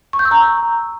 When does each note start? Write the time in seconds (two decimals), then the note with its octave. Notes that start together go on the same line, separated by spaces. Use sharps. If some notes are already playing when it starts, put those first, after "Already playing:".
0.13 C#6
0.19 G6
0.25 E6
0.31 A#5